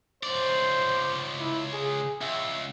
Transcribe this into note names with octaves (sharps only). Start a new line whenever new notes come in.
C#2 C5 D5
E4
G#4
C#2 E5